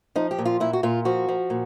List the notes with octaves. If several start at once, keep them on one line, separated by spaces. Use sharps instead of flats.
F3 D#4
G4
A#2
F4
A#2 E4
F#4
A#2 F4
F3 F#4
F3
A#2